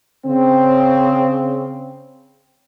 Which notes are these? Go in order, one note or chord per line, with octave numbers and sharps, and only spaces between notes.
C#3 C4